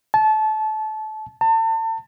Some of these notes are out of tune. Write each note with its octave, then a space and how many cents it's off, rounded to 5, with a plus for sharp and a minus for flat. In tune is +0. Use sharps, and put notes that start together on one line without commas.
A5 -25
A5 +35